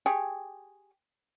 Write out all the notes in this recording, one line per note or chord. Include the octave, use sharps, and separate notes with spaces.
G4 G#4 C#6